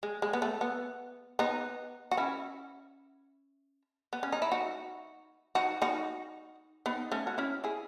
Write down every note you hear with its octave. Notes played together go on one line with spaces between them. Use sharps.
G#3
G#3
B3
A3
B3
B3 D#4
F#4
C#4 E4
B3
C#4
D#4
E4
D#4 F#4
D#4 F#4
D#4 F#4
B3 D#4
A3 C#4
F#4
C#4 E4
E4 G#4